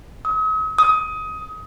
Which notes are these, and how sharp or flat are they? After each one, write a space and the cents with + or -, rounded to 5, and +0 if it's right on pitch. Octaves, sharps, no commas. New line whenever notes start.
D#6 +45
D#6 +20